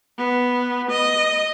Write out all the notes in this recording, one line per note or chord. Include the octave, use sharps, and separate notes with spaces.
B3
D#5